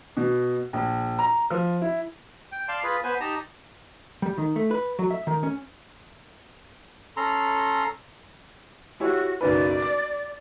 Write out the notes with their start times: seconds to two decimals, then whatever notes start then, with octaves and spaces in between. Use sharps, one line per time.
0.17 B2
0.73 A#1
1.19 A#5
1.50 F3
1.82 E4
2.52 G5
2.68 D5 F5 A5 C6
2.84 F4 G#4 B4
3.04 B3 B4 C5 G#5
3.20 D#4 G4 D#5 A5 A#5
4.22 G3
4.38 D#3
4.56 A3
4.71 B4
4.99 F#3
5.10 E5
5.27 D#3
5.43 C#4
7.17 C#4 A4 A#5 C6
9.00 E4 F#4 G4 C#5
9.41 F#1 B1 B4 D5
9.83 A6